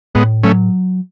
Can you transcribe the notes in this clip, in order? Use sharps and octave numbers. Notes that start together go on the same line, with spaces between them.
A2 G#3 B3
F#3 A3 C#4